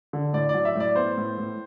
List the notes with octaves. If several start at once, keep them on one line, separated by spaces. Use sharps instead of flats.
D3
A2 D5
D5
F#3
E5
A2 D5
B3 C5
A2
A2